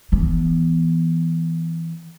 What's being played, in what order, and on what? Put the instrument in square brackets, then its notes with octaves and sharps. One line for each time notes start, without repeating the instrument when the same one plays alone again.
[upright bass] E3 B3